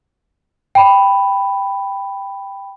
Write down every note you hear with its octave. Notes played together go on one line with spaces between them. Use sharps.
G5 B5